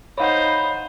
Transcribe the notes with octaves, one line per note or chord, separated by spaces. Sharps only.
D#4 C5 C#5 F5 F#5 B5